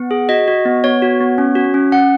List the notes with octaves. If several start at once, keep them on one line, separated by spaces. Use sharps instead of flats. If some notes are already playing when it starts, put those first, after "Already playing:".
Already playing: B3 F#5
G#4
F#4 D#5
F#4
B3
B3 C#5
F#4
B3
C#4
F#4
C#4
C#4 F#5